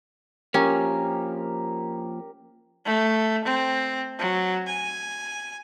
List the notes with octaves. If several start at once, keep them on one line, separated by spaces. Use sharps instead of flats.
F3 A#3 C#4 G4 A#4
A3
C4
F#3
G#5